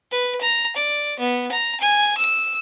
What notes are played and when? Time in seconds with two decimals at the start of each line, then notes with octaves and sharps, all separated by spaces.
0.12 B4
0.41 A#5
0.76 D5
1.20 B3
1.52 A#5
1.81 G#5
2.18 E6